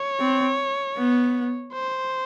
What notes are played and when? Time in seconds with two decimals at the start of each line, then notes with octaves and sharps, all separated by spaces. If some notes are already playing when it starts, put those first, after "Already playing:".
Already playing: C#5
0.20 C4
0.97 B3
1.73 C5